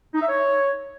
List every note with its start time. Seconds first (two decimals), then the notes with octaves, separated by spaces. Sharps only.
0.14 D#4
0.22 E5
0.29 C#5